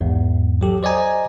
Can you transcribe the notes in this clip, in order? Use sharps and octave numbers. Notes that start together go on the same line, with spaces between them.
A1 E2 G#2
F#3 G4 A4
C5 D5 D#5 G#5 A#5